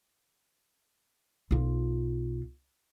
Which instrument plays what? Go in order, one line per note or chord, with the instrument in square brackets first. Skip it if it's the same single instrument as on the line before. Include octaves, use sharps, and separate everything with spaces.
[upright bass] B1 F4